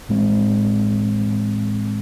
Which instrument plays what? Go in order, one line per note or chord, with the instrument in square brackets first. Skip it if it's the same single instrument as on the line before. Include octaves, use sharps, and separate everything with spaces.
[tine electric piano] A2 E3 G#3 C4